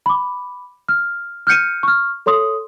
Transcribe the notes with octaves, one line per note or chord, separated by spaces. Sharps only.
B5 D6
F6
F6 G6 C#7 D#7
C#6 F6
A4 C#5 C6 D#6